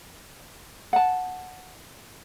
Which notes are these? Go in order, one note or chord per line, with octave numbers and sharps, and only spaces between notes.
F#5 A5